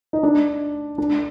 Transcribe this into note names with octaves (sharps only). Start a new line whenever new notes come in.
D#4
D4
D4